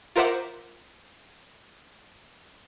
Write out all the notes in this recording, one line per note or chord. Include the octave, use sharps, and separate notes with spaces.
F4 A#4 C5 E5 F#5 D6